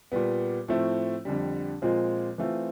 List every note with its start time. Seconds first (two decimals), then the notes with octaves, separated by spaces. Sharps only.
0.12 A#2 G3 B3
0.68 A2 F3 A3 C4
1.25 F2 D3 G3
1.82 A#2 F3 G#3 C4 F4
2.38 E3 A3 C4 F4